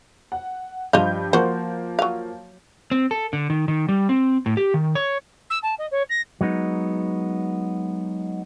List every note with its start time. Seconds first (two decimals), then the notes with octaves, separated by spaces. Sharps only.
0.32 F#5
0.93 G2 F3 C5 D#5 F5 G6
1.33 F3 A#3 F#4 C5
1.99 F#3 F5
2.91 C4
3.11 A4
3.33 D3
3.50 D#3
3.68 D#3
3.89 G3
4.09 C4
4.46 A2
4.57 G4
4.74 D#3
4.95 C#5
5.50 E6
5.63 A5
5.79 D#5
5.91 C#5
6.10 A#6
6.41 F#3 G#3 B3 D#4